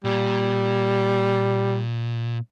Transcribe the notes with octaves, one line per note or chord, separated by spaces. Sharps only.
A#2 G3